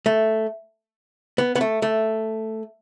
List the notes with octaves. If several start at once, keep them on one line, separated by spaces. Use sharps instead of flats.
A3
B3
B3
A3
A3